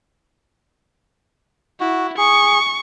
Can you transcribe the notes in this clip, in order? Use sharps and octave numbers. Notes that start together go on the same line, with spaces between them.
E4 F#4
G#4 C#6